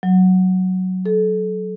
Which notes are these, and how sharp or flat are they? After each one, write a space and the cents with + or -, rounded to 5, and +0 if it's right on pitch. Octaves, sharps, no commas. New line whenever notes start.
F#3 +5
A4 -30